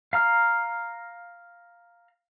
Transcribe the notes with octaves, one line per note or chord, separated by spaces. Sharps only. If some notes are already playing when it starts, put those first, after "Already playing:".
F5 A#5 F6